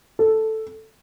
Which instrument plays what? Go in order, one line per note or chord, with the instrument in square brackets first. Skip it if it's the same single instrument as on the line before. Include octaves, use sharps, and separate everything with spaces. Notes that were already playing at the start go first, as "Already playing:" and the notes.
[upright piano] A4